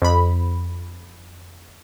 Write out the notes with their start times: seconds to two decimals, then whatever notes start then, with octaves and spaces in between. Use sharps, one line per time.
0.02 F2 B5